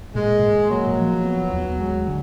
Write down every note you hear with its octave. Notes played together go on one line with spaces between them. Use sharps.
A#2 G#3
A#2
F#3 A#3
F3
B3
D#2
G#3
D3